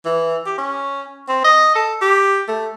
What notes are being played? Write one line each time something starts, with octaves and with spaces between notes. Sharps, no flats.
E3
G4
C#4
C4
D#5
A4
G4
A3